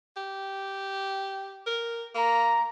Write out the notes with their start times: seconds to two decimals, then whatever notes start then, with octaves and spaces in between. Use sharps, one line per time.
0.17 G4
1.67 A#4
2.15 A#3 A#5